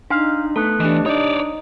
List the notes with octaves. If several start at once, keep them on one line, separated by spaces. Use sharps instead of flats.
D4 D#4 F5 C6
A3 B3 A4
E3 D4 G4 D#5
D4 D#4 C#5 D5